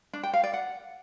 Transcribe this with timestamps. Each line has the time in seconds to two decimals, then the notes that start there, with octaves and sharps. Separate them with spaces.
0.13 D4
0.23 G5
0.34 F5
0.44 D5
0.54 F#5